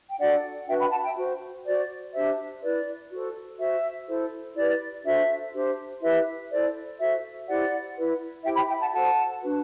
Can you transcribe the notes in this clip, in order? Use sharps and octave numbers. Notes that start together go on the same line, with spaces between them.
G5
D4 F#4 A4 D5 F#5
D4 F#4 B4 E5 G5
G5 B5
F#5 A5
E5 G5
F#4 C5
F#4 C5 D5
D4 G4 C5 E5
E4 B4 D5
F#4 A4 C5
F#4 C5 E5
E4 A4 C5
E4 G4 B4 D5
D4 F#4 A4 C5 E5
D4 G4 C5
E4 G4 B4 E5
E4 A4 C5 D5
F#4 A4 C5 E5
E4 G4 C5 D5 F#5
E4 B4
E4 G4 C5 E5 G5
G5 B5
E5 G5
F#5 A5
F#4 A4 C5 F#5 A5
D4 F#4 B4